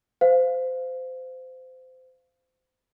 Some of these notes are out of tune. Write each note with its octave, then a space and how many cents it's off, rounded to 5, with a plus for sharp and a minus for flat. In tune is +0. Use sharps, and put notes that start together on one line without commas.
C5 -25 F5 +0